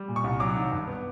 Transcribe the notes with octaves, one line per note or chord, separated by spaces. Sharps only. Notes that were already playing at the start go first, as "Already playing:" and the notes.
Already playing: G3
A#2
C#6
C2
F#3 D6
D#3
G2
B3